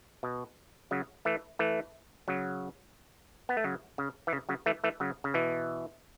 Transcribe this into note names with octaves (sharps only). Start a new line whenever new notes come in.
B2
C#3 F#3
E3 A3
E3 A3
C#3 F#3
B3
A3
C#3 F#3
C#3
E3
C#3
C#3 F#3
E3 A3
E3 A3
C#3 F#3
C#3
B2 E3